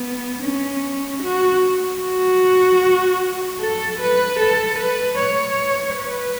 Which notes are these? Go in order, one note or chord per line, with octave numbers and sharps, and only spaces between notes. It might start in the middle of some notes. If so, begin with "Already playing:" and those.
Already playing: B3
C#4
F#4
F#4
A4
B4
A4
B4
C#5
B4